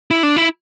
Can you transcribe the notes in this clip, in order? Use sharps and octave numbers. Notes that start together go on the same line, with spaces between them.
E4
D4
E4